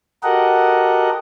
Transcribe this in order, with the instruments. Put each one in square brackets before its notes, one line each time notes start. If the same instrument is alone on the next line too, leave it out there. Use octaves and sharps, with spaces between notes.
[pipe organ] F#4 G4 A4 A#4 D#5 F#5